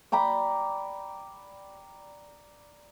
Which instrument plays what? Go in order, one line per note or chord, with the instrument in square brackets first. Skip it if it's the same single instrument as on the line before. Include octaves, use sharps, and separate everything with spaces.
[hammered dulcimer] D5 G5 A#5 B5